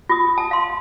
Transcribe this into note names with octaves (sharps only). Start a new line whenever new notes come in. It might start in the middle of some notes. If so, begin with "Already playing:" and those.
F4 D#6
A5
F5 C6